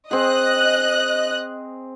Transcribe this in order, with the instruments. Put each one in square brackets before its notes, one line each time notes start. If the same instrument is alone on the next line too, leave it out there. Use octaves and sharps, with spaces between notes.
[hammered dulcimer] C4 G#4 [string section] D#5 F#6